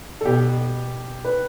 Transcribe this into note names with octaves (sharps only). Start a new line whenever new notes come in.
A4
B2 G4
B4